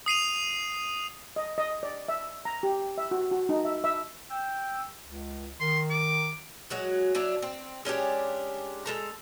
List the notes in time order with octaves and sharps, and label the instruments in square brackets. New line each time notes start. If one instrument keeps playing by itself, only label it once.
[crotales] D#6 C7 D#7 F7
[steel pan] D#5
D#5
D5
E5
A#5
G4
E5
F#4
F#4
D#4
E5
E5
[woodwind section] G5 E6
C#2
[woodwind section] D#3 [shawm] C6
[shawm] D6
[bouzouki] F#3 G#3 F#4
F#3 D4 E4
C4
G#3 C#4 D4 G4
G#3 A4 A#5